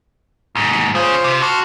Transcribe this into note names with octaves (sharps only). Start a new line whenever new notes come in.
D#2 G#2
C#4 F4 G#4 C5
C3
F#4 A5 C6 F6